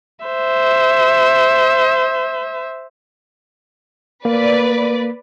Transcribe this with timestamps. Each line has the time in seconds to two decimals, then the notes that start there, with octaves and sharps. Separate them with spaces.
0.25 C5 E5
4.25 A#3 B4 D5